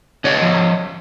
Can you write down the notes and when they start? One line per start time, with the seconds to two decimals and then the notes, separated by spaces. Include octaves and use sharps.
0.24 D3 C#5 D#5
0.42 F3